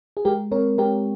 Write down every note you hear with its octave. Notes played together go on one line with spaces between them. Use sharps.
G#4
G#3 G4 A#4
C4 A#4 C#5
C4 G4 A#4